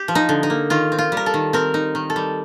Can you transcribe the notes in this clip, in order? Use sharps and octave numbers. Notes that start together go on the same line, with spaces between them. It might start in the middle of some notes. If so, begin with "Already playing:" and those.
Already playing: G4
F3
D#4
D3
D#4
A#3
D#3 F4
C4
F4
G3
A#4
A4
D#3
C4 A#4
D#4
D#3
A4
G3